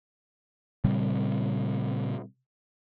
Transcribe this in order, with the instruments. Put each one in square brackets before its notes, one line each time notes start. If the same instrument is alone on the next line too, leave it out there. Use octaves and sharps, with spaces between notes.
[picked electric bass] A#2 C#3 G3 C4